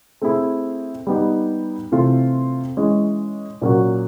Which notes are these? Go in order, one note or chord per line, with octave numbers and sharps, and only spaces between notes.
A3 C4 E4 G#4
G3 B3 D#4 G4
C3 E3 A3 C4 F4
E3 G#3 C#4
A#2 F#3 A#3 C#4 F#4